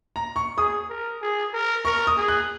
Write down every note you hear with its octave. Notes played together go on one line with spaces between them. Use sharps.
A#5
C#6
G#4 D#6
A#4
G#4
A#4
A#4 C#6
D#6
G#4
F#6